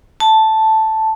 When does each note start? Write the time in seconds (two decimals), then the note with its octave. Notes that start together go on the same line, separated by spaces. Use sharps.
0.20 A5